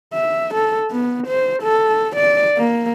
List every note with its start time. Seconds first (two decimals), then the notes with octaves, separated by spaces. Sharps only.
0.14 E5
0.54 A4
0.91 B3
1.27 C5
1.63 A4
2.16 D5
2.57 A#3